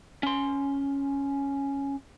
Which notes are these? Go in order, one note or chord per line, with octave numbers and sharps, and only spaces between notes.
C#4 C6